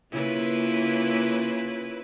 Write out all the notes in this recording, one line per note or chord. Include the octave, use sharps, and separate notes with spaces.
C#3 A#3 E4 F4 B4